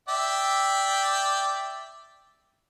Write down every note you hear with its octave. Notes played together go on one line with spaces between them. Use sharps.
D5 E5 G5